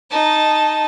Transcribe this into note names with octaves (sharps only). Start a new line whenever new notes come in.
D#4 A5